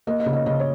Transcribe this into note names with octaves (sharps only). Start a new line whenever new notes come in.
A#3 D#5
D#5
C#3
D#5
C#3 D#5
C#5